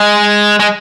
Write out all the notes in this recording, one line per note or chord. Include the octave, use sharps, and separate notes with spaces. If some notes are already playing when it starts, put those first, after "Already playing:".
Already playing: G#3
G#3